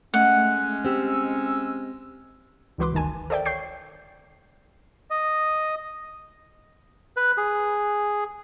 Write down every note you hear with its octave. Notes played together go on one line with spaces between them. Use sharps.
G#3 A3 C#4 F#5
C4 G4 E6
C#2 E3 F#4 B4 C6 D6
G1 D2 D#3 G#5 A5
A4 A#4 C5 D5 E5 G5
C#5 G5 C#6 G6 C7
D#5
B4
G#4